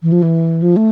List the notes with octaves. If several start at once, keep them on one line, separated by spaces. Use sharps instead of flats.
E3
F3
E3
F3
A3